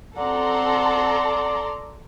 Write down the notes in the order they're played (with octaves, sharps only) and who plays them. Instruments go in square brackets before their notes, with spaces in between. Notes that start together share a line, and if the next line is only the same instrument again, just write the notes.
[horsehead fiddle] C4 F#5 [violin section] A4 A#5 C6 [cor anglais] D5